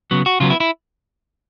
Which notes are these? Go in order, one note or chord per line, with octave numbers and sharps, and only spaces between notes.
C#3 F#3 B3
F#4
C#3 F#3 B3 F4
E4
E4